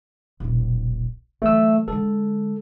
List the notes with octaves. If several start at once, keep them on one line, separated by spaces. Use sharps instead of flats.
D#1 B1
E3 F#3 A3 E6
D3 G#3 A4